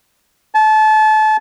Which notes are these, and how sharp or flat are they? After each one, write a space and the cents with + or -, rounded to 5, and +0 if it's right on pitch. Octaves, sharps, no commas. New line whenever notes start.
A5 -30